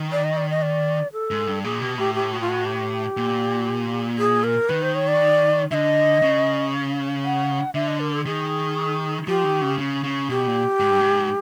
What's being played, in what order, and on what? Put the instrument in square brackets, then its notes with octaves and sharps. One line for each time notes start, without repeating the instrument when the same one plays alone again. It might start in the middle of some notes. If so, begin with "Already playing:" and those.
Already playing: [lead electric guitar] D#3
[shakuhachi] D5
D#5
D5
D#5
D5
A4
[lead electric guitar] G#2
G2
[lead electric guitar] A#2 [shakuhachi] G#4
[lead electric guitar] B2 [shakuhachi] G4
[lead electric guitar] A2 [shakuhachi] G4
[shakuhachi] G4
F#4
F4
F#4
G4
[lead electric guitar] A#2
[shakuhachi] G#4
A#4
[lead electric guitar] D#3 [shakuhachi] B4
[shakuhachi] C5
C#5
D5
[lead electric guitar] D3 [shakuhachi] D#5 E5
[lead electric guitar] C#3
[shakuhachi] F#5
[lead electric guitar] D3 [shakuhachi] E5
[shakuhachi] D#5
A#4
A4
[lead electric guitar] D#3 [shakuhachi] G#4
[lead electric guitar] F3 [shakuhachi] G4
[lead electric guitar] D#3
C#3
C#3
C#3
[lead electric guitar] B2 [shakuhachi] G4
[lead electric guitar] A#2
G#2
G2
G#2